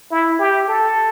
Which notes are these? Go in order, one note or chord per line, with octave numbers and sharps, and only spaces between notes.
E4
G4
A4